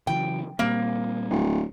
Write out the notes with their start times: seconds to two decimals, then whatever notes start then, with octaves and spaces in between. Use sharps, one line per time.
0.07 C#3 E3 F#3 G5
0.59 A#2 G3 A#3 C4
1.30 D1